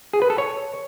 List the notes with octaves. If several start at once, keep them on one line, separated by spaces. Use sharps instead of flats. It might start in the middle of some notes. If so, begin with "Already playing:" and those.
G#4
B4
A4
C#5